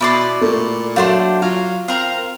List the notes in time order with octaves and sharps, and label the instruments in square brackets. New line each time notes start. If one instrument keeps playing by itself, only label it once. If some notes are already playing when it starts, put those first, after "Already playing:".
[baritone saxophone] B2 [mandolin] E4 D5 C6
[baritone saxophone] A#2 [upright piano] A3
[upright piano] F#3 F#4 F5 [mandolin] A3 D4 C5
[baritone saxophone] F#3 [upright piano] F4 [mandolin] F5
[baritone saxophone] C4 [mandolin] A#4 F5